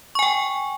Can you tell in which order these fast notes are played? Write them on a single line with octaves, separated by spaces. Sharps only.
C#6 G#5 G5